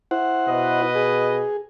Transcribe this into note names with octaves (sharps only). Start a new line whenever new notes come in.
E4 C5 F#5
B2 B4 D#5
G#4